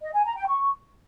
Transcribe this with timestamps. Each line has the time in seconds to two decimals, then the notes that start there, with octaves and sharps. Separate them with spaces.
0.02 D#5
0.13 G#5
0.25 A#5
0.36 G5
0.48 C#6